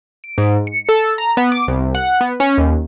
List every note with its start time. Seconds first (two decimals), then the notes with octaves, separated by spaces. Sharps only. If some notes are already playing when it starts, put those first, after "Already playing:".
0.24 D7
0.38 G#2
0.67 C#7
0.89 A4
1.18 A#5
1.37 B3
1.52 D6
1.67 C2
1.95 F#5
2.21 B3
2.40 C#4
2.58 D#2